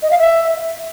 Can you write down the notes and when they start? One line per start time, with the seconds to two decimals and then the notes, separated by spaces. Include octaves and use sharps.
0.02 D#5
0.11 F5
0.19 E5